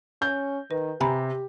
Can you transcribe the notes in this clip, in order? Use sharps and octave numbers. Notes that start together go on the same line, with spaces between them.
C#4 G6
D#3 B4
C3 G4 G#5 A#5 B5